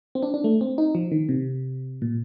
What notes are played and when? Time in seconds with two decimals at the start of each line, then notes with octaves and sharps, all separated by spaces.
0.15 C4
0.23 D4
0.34 D4
0.44 A3
0.61 C4
0.78 D#4
0.95 F3
1.12 D#3
1.29 C3
2.02 A#2